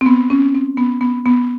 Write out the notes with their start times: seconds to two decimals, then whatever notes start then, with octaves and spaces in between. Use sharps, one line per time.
0.01 C4
0.06 B3
0.30 C#4
0.54 C4
0.77 B3
1.01 B3
1.25 B3